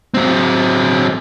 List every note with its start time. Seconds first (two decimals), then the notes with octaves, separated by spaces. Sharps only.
0.14 F#3 C4